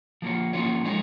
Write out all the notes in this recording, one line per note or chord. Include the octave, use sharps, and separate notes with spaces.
F3 A#3 C#4 F4 C#5
F3 A#3 C#4 F4 C#5
F3 G#3 D#4 C#5